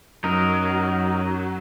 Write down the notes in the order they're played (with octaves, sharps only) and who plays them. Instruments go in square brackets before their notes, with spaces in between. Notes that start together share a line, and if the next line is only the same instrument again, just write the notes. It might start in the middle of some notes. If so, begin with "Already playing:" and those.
[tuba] F#2 [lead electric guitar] F#3 [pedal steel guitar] D#4 A#4